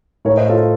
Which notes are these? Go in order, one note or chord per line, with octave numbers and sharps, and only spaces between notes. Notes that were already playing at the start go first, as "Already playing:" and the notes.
A2 A#4 C#5
C5 D#5
F4 A4